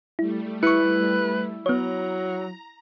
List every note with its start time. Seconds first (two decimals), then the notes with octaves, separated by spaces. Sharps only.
0.19 G3 A3 E4
0.63 E4 B4 C#6 C#7
1.66 F#3 B3 C#5 A#5